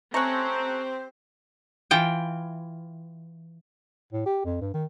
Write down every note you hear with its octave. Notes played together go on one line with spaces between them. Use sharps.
A3 C4 C#4 G4 C5 A#5 C#6 F#6
E3 F4 G5
A2
G4
F2
G2
D#3